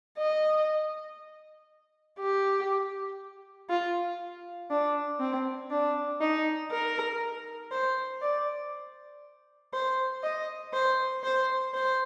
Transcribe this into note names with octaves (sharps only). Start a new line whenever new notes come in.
D#5
G4
F4
D4
C4
D4
D#4
A#4
C5
D5
C5
D#5
C5
C5
C5